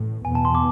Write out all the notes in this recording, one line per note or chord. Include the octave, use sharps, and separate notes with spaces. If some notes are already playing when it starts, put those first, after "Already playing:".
Already playing: A1 A2
E2 B2 B3 G#5
A5
C6
D6